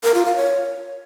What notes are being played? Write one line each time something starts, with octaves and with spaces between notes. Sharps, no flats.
A#4
F4
F5
C#5